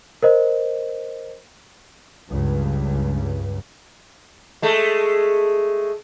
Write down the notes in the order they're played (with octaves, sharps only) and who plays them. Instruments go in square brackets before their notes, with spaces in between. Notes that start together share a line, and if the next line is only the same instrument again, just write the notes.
[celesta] A#4 C5 D#5
[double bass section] C#2 G2
[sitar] G#3 A3